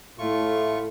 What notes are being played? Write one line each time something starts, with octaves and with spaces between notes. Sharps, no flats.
A2 A3 F4 C#6